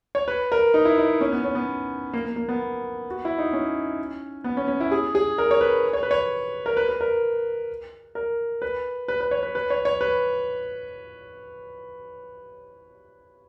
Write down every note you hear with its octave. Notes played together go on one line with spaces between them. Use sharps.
C#5
B4
A#4
D#4
E4
D#4
C#4
B3
C#4
B3
A#3
A#3
A#3
B3
F#4
E4
D#4
C#4
B3
C#4
C#4
E4
G#4
G#4
A#4
C#5
B4
C#5
B4
C#5
A#4
B4
B4
A#4
A#4
B4
B4
B4
C#5
B4
B4
C#5
C#5
B4